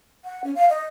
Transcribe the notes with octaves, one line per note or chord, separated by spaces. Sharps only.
F#5
C#4
F5
D#5